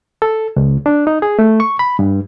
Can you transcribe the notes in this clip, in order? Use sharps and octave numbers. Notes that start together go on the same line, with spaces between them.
A4
C#2
D4
D#4
G#4
A3
C#6
B5
G2